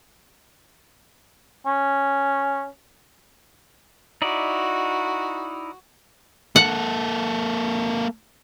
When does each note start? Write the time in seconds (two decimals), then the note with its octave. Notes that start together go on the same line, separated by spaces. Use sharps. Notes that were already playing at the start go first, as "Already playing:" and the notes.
1.66 C#4
4.22 D#4 E4 F#4 D5
6.56 A#3 A4 F#5